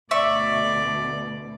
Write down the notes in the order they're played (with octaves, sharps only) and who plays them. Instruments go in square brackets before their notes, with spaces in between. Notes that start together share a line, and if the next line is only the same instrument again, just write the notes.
[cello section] D2 B2 [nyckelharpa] D5 [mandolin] E5 C#6